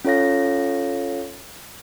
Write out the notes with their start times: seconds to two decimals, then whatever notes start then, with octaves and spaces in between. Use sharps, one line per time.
0.05 C#4 F4 A4 C#5 F5 A#6